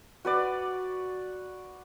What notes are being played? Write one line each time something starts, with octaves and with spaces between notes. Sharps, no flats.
F#4 B4 D5